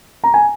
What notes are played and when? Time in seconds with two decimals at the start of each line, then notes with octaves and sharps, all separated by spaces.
0.24 A#5
0.34 G#5